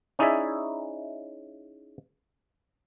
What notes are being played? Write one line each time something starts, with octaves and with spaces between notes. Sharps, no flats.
C#4 D#4 E4 G#4 D5 E5